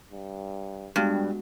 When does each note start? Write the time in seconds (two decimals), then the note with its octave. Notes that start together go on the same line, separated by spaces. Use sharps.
0.11 G2
0.96 G2 G3 G#3 B3 F#4